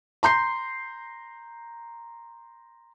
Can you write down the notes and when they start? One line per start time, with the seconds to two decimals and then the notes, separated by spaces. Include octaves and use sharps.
0.23 A#5 C6 G6 C7